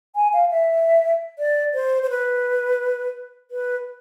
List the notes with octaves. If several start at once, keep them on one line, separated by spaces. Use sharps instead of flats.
G#5
F5
E5
D5
C5
C5
B4
B4